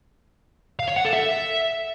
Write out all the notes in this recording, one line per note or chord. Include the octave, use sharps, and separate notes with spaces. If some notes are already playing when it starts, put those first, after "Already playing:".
F5
C#5
F#5
A4
E5